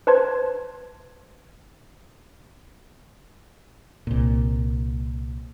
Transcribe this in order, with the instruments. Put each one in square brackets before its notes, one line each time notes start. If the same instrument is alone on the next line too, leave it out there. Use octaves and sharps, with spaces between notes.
[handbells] B4 C5 A5 C6 G#6
[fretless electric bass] C2 A#2